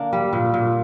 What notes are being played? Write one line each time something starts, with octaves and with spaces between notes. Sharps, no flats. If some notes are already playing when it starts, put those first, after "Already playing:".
Already playing: D3 A#3 D4
G3
A#2
A#2